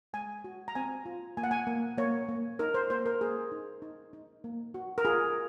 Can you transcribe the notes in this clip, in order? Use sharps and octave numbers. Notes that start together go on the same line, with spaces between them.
G#3 G#5
F#4
A#5
C4 G#5
F4
A#3 G#5
F#5
G#5
A#3
A#3 C#5
A#3
D#4 A#4
C5
A#3 C5
A#4
A#3 G#4
D#4
D#4
D#4
A#3
F#4
A#4
F4 G#4